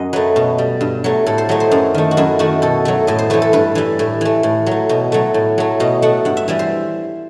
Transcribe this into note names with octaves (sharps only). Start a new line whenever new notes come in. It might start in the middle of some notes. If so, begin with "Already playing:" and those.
Already playing: F#2 D#5
F#3 A3 B4
B2
G3
G2
F#3 A3
A2 A4
C5
F#3 A3 D#5
C5
F#2
D#3 A3
F#4
F#2 E4
D#3 A3 F#4
B2 A4
F#3 A3
A2 D#5
C5
E3 A3 B4
A4
G2 B4
E3 G3
A2
E3 A3
A2
F#3 A3
B2
F#3 A3
A2
F#3 A3
B2 D#5
A3 F#5
G2 F#5
E5
E3 G3 E5
C5